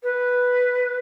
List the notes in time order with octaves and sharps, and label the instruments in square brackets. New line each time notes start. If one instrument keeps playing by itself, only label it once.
[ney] B4